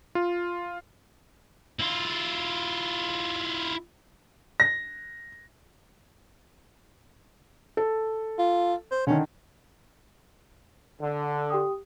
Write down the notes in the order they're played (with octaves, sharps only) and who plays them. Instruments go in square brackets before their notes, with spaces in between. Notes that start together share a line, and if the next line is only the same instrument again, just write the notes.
[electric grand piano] F4
[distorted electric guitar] E4 F4
[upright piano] A#6
[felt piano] A4
[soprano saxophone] F4
C5
[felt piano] D3 D#3 [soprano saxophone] C#4
[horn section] D3
[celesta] G4 G5 D#6